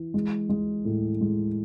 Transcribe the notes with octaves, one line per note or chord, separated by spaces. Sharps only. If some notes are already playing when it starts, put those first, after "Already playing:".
Already playing: E3
G#3
G#3
A2
G#3